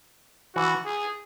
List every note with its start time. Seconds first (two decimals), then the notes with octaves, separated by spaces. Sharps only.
0.55 E3 F#4
0.85 G#4